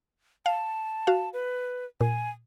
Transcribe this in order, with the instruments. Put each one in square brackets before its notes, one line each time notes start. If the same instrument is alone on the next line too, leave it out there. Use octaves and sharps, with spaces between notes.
[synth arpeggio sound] F5 [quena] A5
[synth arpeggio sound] F#4 F5
[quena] B4
[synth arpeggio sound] A#2 [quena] G#5